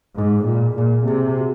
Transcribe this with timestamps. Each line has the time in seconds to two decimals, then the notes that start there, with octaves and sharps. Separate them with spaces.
0.18 G#2 G#4
0.48 A#2 F4
0.78 A#2 G#4
1.07 C3 G#4
1.38 F#4